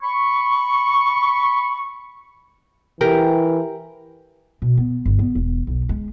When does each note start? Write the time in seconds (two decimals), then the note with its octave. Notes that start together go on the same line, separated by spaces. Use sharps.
0.03 B5 C#6
3.01 E3 G4 A#4
4.62 B2
4.77 B3
5.06 G1
5.19 B3
5.35 E1
5.67 B1
5.89 G#3